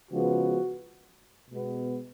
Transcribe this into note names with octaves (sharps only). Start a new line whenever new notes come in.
C#3 F3 G#3 B3 F#4
B2 G#3 B3